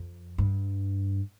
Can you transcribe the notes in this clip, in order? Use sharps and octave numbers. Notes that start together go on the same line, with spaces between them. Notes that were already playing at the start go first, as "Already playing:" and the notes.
Already playing: F2
G2